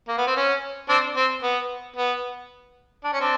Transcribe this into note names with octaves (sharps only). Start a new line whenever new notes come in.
A#3
B3
C4
C#4
C4 D4
C4
B3
B3
D4
C#4
C4 D4